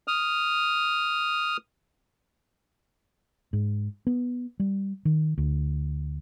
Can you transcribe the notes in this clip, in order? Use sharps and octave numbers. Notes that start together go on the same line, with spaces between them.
D#6 F6
G#2
B3
G3
D#3
D2